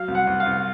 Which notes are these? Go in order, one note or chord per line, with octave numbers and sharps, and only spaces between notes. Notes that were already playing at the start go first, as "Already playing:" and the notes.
Already playing: F#3 F5
C2
F#5
C2
F5
C2